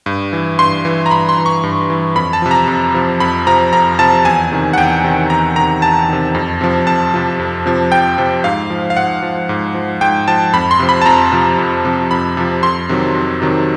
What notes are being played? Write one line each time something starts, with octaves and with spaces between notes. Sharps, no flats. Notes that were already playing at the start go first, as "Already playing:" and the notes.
G2
E3
G2 C6
E3
A#5
G2 B5
C6
E3
C#6
G2
E3
F2 B5
A5
C3 F3
A#5
F2
C3 F3
F2 B5
C3 F3 A#5
F2 A#5
C3 F3 A5
E2 G#5
C3 D#3
F#5
E2 G5
C3 D#3
E2 A#5
C3 D#3 A#5
E2 A5
C3 D#3
F2
C3 F3
F2 A5
C3 F3
F2
C3 F3
F2 G5
C3 F3
G#2 F5
F3
F5
G#2 F#5
F3
G#2
F3
G#2 G5
F3 A5
F2 B5
C6
C3 F3
B5
A5
F2 A#5
C3 F3
F2
C3 F3
F2 B5
C3 F3
F2 C6
C3 D#3 F#3
F2
C3 D#3 F#3